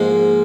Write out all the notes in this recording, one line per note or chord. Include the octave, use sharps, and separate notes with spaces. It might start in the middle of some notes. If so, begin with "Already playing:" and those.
Already playing: G#2 F3 A#3